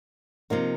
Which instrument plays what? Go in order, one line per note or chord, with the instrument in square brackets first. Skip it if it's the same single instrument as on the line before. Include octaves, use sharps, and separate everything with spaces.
[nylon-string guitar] C3 F3 A#3 D#4